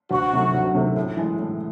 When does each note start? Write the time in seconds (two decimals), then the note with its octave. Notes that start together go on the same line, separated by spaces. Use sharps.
0.11 D2 F#4
0.33 C3 D#3 F#3 A3
0.54 D2
0.75 C3 D#3 F#3 A3
0.96 A2
1.17 E3 G#3
1.39 A2